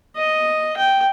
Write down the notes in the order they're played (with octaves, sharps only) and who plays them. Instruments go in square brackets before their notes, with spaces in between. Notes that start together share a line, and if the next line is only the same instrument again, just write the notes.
[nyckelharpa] D#5
G5